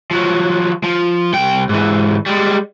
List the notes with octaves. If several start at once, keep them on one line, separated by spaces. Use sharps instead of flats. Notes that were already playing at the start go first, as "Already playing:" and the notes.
F3 F#3
F3
C2 G5
G#2 E3
G3 G#3